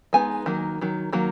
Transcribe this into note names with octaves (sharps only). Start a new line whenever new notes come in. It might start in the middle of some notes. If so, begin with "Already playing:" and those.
G#3 B3 D#4 G#5
D#3 F#3 A#3
D#3 F#3
D#3 F#3 A#3